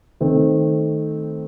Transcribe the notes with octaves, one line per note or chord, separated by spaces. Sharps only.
D#3 A3 C4